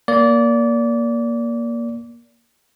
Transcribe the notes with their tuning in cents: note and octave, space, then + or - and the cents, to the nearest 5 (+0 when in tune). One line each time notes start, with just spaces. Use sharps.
A#3 +10 D5 -25